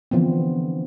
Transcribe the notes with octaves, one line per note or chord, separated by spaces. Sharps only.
D3 E3 F3 B3 C4